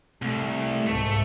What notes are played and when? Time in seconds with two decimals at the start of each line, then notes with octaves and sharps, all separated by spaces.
0.22 C2 A3
0.87 C2 G#2 A3